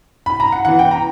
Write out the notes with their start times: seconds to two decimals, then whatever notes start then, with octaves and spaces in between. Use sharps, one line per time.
0.26 B5
0.40 A#5
0.52 F#5
0.65 E3 B3 F#5
0.79 G5
0.91 A#5